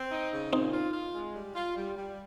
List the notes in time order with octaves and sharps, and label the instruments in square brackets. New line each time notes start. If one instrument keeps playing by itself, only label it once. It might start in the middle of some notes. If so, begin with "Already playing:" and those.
Already playing: [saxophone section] C4
D#4
C#3
[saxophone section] A#2 [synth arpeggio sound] C4 D#4
[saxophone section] F4
F4
G#3
G3
F4
G3
G3